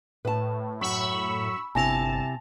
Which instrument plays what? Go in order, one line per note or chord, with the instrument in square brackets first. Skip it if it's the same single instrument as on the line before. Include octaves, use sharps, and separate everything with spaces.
[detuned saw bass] A2 [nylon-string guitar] B4 A5
[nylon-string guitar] F#2 [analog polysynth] B5 C#6 E6
[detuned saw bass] G1 [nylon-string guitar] C3 E4 [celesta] G#5 A#6 F7 [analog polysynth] A5